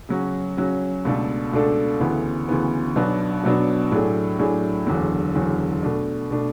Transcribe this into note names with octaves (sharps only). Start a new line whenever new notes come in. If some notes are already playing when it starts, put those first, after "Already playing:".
C#3 F#3 C#4 F#4
C#3 F#3 C#4 F#4
C#2 B2 A3 D4 A4
C#2 B2 A3 D4 A4
D2 C#3 E3 B3
D2 C#3 E3 B3
B1 B2 F#3 B3 D4
B1 B2 F#3 B3 D4
A2 F#3 A3 D4 G#4
A2 F#3 A3 D4 G#4
F#1 E2 D3 F#3
F#1 E2 D3 F#3
B2 A3 D4
B2 A3 D4